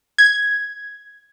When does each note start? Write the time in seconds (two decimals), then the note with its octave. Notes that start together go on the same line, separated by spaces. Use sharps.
0.18 G#6